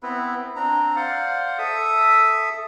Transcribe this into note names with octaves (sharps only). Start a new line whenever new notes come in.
B3 C4 E4 B4
C4 D4 A#5
C5 D5 F5 F#5
A4 E5 D#6 E6